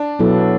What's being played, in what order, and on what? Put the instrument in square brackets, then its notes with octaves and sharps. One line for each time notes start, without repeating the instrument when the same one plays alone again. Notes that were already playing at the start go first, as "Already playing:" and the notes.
Already playing: [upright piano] D4
[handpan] B2 F#3 B3 E4 A4